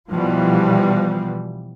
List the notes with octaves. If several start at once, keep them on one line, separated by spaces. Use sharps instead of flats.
B2 E3 F3 G3